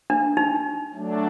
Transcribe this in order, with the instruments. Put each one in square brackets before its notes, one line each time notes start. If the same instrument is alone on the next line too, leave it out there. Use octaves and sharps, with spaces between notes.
[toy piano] D4
D#4
[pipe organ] F#3 A3 D4